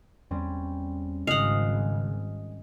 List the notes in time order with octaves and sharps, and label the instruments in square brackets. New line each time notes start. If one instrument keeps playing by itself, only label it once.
[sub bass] E2 [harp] G3 C4 C#4
[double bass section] G#1 [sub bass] C#3 [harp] D#5 G#5 F#6 [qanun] F5 F#5